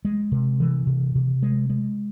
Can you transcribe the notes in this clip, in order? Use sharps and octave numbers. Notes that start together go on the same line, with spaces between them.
G#3
C3
E3
C3
C3
G#3
G#3